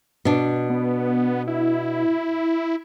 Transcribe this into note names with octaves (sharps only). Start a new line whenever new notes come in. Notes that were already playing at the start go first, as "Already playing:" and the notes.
B2 D4
B3
E4